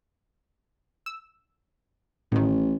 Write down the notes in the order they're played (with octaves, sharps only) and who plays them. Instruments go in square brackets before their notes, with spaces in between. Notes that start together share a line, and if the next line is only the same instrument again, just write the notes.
[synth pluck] E6
[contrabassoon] A1 [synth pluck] A2 D#3